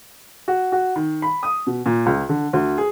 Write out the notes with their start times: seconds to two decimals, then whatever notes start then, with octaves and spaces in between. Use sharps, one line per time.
0.48 F#4
0.72 F#4
0.96 D#3
1.22 B5
1.43 D#6
1.67 B2
1.86 A#2
2.06 C#2
2.29 D3
2.53 D2
2.78 G#4